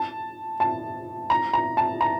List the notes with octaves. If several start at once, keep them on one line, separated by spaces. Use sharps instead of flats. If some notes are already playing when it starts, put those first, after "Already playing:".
Already playing: A5
A5
A#5
A#5
A5
A#5